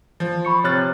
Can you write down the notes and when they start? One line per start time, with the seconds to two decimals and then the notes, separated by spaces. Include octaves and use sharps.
0.20 F3
0.45 B5 C#6 C#7
0.64 C3 C#5 F6 F#6 A6